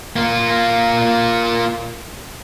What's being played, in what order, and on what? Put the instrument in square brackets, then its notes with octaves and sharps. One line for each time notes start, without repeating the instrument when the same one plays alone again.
[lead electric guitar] A#3 F4